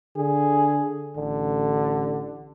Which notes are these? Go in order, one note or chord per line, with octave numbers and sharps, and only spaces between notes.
D3 G#4
A1 D3